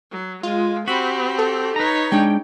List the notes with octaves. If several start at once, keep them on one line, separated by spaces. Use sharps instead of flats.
F#3
G#3 F4
C4 F#4 G4 B5
A4
D#4 B4 C#5 A#5
G#3 D4 G5